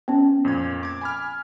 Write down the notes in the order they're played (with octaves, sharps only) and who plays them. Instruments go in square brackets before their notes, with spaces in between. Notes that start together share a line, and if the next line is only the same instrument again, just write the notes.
[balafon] B3 C#4
[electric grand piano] F2 A#2 G#6
D6 G#6
G#5 B5 F6